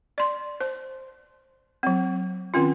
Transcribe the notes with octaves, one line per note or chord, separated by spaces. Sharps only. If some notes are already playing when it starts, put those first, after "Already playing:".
D5 C6
C5
F#3 C4
D#3 C4 C#4 F4